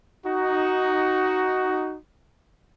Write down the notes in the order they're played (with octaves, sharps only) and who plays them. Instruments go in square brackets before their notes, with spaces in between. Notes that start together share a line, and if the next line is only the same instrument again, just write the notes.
[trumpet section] D#4 F#4